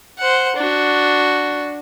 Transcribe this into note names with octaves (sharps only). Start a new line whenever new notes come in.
C5 F#5
D4 F#4